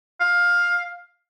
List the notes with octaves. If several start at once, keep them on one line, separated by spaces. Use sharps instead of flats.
F5